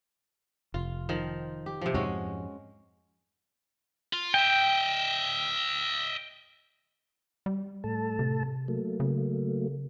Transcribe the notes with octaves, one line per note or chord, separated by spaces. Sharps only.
F1 F4
D#3 F3
G4
C3 F3
F2 G#2 G#3 C#4 F#4
F4
D#5 E5 G5
G3
A2 A4 A5
C3
F#3 A3 A#3
C#3